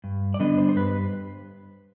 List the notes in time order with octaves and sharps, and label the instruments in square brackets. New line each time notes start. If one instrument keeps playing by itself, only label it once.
[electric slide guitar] G2
D5
D3 G3 B3 D4 D#5
C5
C5
G2 B4